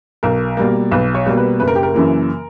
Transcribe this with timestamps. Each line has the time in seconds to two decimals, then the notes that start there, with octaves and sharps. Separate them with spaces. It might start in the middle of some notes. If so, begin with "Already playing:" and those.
0.23 B1 A#4
0.57 B2 G3 A#3
0.91 B1 B4
1.15 C#5
1.26 B2 G3 A#3
1.37 B4
1.60 F#1 B4
1.68 A#4
1.76 G4
1.83 A#4
1.94 F#2 C#3 E3 A#3